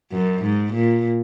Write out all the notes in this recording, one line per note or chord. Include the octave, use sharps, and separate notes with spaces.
F#2
G#2
A#2